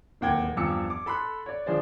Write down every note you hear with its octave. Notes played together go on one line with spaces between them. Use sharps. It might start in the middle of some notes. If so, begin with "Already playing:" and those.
D1 D#2 F#5 G5 G#6
E2 G2 F3 D6 E6 C#7
D6
A4 B5 C6 F#6
C#5 D5
F3 D4 G#4 C5 D5